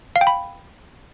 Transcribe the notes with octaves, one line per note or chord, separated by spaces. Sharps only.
F5
G5
B5